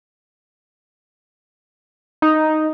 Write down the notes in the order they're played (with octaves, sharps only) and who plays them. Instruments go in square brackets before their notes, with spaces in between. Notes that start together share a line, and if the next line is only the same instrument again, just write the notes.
[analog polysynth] D#4